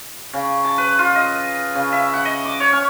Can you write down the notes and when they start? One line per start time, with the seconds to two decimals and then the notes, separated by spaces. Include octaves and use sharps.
0.33 C#3
0.65 A5
0.78 B4
0.99 F4
1.15 D#5
1.75 C#3
1.93 E5
2.13 F#5
2.25 D#5
2.45 D6
2.60 C#5
2.72 C#4